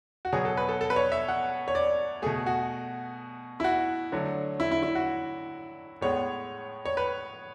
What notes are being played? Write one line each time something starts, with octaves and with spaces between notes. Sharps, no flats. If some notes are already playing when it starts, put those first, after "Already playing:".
F#4
B2 F#3 B3 G#4
A4
B4
A4
A4
B4
C#5
E5
F#5
C#5
D5
B2 A3 G#4
F#4
E4
F#4
D3 F#3 A3
E4
E4
E4
F#4
A2 G#3 B3 C#5
C#5
B4